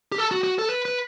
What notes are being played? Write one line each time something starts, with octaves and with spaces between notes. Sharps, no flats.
G4
A4
F#4
F#4
A4
B4
B4